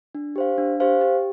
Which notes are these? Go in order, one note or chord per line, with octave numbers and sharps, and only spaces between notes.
D4
G4 C5 F5
D4
G4 C5 F5
G4